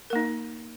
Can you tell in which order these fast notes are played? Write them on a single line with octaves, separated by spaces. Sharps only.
A#4 A#3 D#4